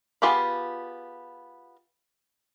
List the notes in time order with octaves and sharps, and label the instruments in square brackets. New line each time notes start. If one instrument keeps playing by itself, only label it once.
[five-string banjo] B3 F4 G4 G#4 B5